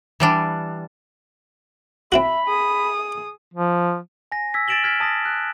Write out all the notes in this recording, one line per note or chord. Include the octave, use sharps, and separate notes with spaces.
E3 G3 D4
C4 E4 F#4 E5 B5
G#4 D#6
F3
G#5 A#6
E6 G#6 B6
A6 A#6 D7 E7 F#7 G7
F6 G#6 B6
A5 D#6 A6 A#6
F#6 A6